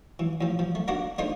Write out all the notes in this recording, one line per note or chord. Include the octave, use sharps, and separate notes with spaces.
E3
A2 F3
F3
A3
A#3 D4 F#4 D5 F#5
A3 D4 D#4 F4 A#4 C5